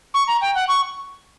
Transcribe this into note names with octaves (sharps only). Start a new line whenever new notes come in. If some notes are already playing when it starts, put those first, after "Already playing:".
C#6
A#5
G5
F#5
C#6